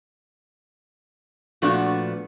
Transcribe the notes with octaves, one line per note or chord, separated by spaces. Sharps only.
A#2 F3 A3 B3 D4 F#4